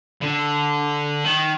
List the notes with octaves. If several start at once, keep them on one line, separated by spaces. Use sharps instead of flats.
D3
D#3